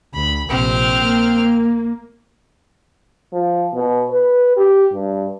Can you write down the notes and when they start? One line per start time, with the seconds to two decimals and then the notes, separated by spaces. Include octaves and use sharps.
0.14 D2 B5
0.49 A#1 C3 C4 F6
1.02 A#3
3.33 F3
3.73 B2
4.10 B4
4.57 G4
4.93 G2